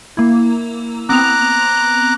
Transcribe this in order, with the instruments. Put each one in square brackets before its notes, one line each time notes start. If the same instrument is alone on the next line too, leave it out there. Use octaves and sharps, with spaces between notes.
[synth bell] A#3 E4
[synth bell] B3 C4 F7 [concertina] A#5 D6 F#6